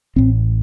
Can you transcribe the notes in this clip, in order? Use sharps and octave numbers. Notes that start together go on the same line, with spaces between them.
A1 A2 C4